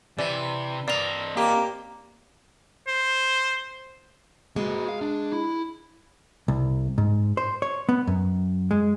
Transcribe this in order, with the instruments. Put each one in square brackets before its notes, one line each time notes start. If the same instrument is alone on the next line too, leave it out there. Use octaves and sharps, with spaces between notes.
[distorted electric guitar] C3 [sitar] E3 [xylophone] D5
[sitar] A#3 [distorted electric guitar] C4 D#5 [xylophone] D5 F7
[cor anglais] A#3 [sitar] G4
[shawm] C5
[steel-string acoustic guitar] G#3 [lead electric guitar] A#3 F#4
[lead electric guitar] F5
D4
E4
[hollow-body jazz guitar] C2
G#2
C5
C#5
B3
F#2
G#3